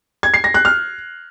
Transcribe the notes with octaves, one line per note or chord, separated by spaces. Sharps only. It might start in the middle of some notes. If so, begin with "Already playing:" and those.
G#6
C7
A#6
F#6
F6